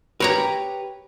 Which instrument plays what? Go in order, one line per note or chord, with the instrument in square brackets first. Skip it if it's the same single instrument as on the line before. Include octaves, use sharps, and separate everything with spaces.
[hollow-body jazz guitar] G4 B4 [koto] A#4 C#5 A#5